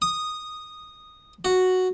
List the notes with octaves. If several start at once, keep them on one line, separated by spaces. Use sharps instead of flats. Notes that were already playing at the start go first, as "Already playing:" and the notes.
D#6
F#4